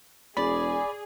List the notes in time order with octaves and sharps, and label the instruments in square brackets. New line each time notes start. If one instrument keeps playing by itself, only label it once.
[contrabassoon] E1 [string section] G#4 [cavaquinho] D5 [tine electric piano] B5